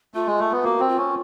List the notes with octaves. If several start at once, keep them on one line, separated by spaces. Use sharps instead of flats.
A3 F4
G#3
A3
B3
A#3 F#4
C4
F4
C#4